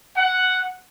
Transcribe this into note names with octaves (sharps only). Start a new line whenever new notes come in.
F#5